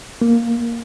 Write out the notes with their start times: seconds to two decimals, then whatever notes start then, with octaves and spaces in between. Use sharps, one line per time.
0.22 A#3